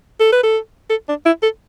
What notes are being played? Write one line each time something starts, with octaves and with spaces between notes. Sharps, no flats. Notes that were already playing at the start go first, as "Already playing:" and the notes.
A4
B4
A4
A4
D4
E4
A4